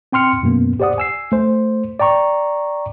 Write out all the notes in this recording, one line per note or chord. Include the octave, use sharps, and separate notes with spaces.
C4 G5 C6 F6 C#7
F#2 B2 A#3 B3
G4 C5 D5 F#5 D#6
G#5 E6 C7
A3 C5
D5 G5 A#5 C#6